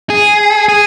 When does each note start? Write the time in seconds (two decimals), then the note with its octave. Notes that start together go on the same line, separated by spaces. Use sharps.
0.10 G#4
0.69 G#4